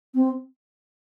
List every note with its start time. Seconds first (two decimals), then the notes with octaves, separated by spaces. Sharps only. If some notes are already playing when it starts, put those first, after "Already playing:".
0.15 C4